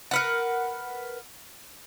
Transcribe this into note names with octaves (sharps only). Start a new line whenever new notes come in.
A#4 B4 F#5